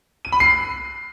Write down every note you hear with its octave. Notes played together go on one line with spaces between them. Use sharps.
D#7
B5
C7